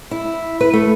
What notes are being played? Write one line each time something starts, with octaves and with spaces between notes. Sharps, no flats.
E4
B4
A3